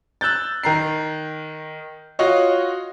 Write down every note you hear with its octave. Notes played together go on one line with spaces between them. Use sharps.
E6 F#6 G6 A6
D#3 A#5 C7
F4 F#4 C#5 D#5